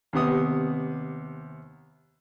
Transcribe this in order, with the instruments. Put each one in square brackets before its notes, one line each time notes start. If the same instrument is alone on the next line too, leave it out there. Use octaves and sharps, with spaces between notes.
[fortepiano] D#2 C3 B3 D#6